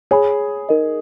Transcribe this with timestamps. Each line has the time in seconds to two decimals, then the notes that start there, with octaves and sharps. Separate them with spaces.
0.11 G#4 C#5 G#5 B5
0.69 D#4 A#4 D#5